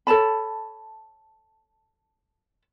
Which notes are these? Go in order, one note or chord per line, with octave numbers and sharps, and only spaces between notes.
A4 C#5 A5 B5